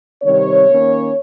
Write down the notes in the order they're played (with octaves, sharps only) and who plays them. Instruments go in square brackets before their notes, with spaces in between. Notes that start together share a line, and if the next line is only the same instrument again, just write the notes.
[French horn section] C3 D#3 G3 C4 C#5
D#3 A#3 C#4